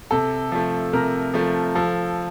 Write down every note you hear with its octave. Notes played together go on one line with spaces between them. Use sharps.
C3 A4
F3 A3
C3 A#4
F3 A3
F3 A4